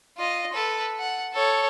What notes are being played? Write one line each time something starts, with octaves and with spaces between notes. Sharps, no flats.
F4 D#5
A4 B4
F#5
A4 C#5